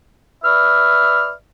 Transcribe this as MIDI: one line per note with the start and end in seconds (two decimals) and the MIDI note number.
0.44 1.32 71
0.44 1.32 74
0.44 1.32 76
0.44 1.32 89